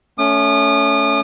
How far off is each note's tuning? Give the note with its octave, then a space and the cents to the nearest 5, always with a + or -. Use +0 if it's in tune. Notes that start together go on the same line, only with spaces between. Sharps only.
A3 +0 C#4 +20 D#6 -40